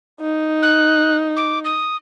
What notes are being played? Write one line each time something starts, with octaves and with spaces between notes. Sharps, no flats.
D#4
F#6
D6
D#6